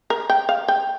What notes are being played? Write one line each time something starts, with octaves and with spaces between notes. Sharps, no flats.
A#4
G5
F5
G5